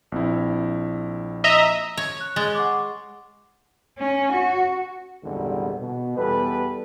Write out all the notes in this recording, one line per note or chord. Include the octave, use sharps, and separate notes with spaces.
A#1 C4 E4
D#5 E5 A#5
C#5
F#6
G#3 A6
F#5 C#6 D6
C#4
F#4
G#1 E2 A#2 D3 G3 G#3
B2
E2 G3 B3 A4 B4